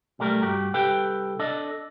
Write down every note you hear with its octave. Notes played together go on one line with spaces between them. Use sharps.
B1 G3 A3 A#4
C2 G2 F#4 G4
C2 G4 A4 B4 G5
D4 A4 D#5